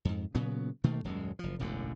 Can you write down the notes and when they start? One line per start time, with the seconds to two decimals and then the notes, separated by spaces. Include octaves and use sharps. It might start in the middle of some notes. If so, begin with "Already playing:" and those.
0.05 F2 G#2
0.35 A#2 C#3 F#3 B3
0.84 B2 D#3 A3 A#3
1.04 D#1 F#2 G#3
1.39 F#1 F3
1.59 E1 A1 F#2 D3